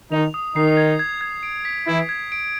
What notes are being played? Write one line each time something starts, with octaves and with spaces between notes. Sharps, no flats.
D#3 D#4 F7
D#6
D#3 D#4 C7
G#6
G#6
G#6
D7
B6
E3 E4 G#6
G#6
D7